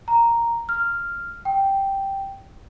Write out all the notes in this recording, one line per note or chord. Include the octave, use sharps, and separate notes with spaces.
A#5
F6
G5